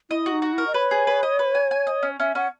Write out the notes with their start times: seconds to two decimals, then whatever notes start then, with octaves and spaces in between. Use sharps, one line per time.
0.10 E4 D#5
0.26 F#4
0.31 D#4
0.42 F#4
0.53 E4 A#4
0.67 D#5
0.74 B4 C#5
0.91 G#4
1.07 B4
1.23 D#5
1.39 B4
1.55 G#5
1.71 G#5
1.87 D#5
2.03 C#4
2.20 C#4 E5
2.35 C#4 F#5